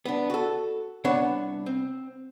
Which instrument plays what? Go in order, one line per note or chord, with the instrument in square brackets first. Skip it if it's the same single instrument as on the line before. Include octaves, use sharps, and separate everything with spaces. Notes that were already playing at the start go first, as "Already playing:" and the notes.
[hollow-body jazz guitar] B3 D4
F#4 A4
C2 B3 D4 C#5 F#5
C4